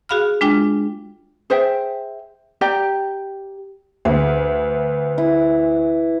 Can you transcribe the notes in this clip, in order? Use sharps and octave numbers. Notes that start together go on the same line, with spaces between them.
F#4 G#4 F5 B5 F6
G#3 D4 F4 G5
G#4 C5 E5 G5
G4 D5 G5 A#5
D2 B4
E4